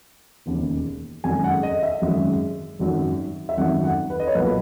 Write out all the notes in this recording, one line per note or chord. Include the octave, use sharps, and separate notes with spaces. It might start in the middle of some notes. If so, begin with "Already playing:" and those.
E1 D#2 C#3
G#1 F#2 C#3 G#3 G#5
F#5
D#5
E5
G#1 F#2 C#3 G#3
G#1 F#2 D#3 F#3
E5
G#1 F#2 D#3 F#3 F#5
F#5
B4
D#5
C#5
B1 A#2 F#3 A#3 B4